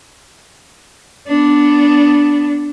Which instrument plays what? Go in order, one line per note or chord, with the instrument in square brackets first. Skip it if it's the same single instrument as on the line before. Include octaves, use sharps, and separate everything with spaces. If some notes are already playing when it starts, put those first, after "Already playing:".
[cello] B3 D4